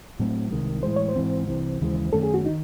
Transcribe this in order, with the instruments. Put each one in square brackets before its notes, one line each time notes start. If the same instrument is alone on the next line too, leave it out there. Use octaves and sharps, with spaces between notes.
[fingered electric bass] A2 F#3 A3 C4
C2 C3 D#3 G#3
[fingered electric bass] A2 E3 G#3 [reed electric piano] C5
[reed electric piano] C#5
C5
[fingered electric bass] G#2 E3 C4
C2 C3 E3
D#2 C#3 E3 G#3
[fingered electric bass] F#2 D#3 A3 C#4 [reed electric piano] A4
[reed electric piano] G#4
F#4
[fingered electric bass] C3 D#3 [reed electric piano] D#4